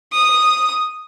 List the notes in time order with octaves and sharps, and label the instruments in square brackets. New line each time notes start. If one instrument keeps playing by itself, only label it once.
[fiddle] D#6